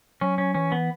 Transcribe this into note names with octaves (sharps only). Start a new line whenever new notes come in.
F#3 C#4
C#4
E3 C#4
B3